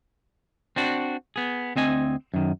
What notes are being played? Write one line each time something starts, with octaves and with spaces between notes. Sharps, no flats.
C4 D4 F#4
B3 G#4
D2 C4 D#5 G#5
F#2 D#3